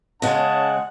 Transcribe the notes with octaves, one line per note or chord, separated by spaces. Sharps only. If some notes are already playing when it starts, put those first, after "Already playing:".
C#3 G#3 C#4 F#5 A5